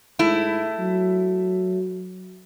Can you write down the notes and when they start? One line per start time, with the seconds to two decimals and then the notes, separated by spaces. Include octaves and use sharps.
0.19 G#2 A3 E4
0.79 F#3